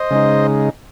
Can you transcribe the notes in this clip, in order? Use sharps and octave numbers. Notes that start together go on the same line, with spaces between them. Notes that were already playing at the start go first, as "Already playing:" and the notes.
Already playing: C5 D#5
C#3 G#3 D#4